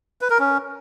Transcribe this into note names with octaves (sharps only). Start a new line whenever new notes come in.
B4
A#4
C#4